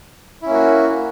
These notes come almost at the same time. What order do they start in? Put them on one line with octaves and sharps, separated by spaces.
E4 C#4 A#3 F#4